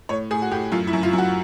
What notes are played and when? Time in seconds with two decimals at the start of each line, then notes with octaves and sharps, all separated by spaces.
0.09 A2 C#5
0.31 A2 G#4
0.42 F#4
0.51 A2 G4
0.72 F#2 F4
0.87 E4
0.93 F#2
1.03 F4
1.13 F#2
1.18 F#4